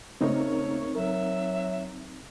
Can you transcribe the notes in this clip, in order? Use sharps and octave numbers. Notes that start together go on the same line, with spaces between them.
C#3 A3 A#3 C4 D#4 C#5
F#3 A#4 E5